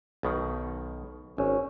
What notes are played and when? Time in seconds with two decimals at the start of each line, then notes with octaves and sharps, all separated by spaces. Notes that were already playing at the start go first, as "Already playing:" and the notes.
0.23 B1 B2 D#3
1.38 G#1 C#4